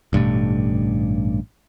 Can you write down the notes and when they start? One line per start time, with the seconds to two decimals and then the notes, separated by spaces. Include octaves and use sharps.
0.13 A1 G2 B2 A3